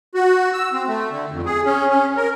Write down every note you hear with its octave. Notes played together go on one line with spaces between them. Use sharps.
F#4
E6
C4
A3
D3
F2
G#4
C#4
C#4
A#4